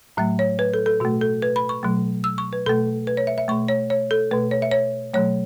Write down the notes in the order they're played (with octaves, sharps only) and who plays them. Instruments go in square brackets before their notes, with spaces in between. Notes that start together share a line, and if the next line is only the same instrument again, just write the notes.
[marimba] A2 F#3 A3 E5
C#5
B4
A4
A4
B2 A3 F#4
A4
B4
B5
C#6
B2 F#3 A3
E6
C#6
B4
B2 A3 A4
B4
C#5
E5
E5
B2 A3 C#6
C#5
C#5
A4
B2 A3 B4
C#5
E5
C#5
B2 F#3 A3 C#5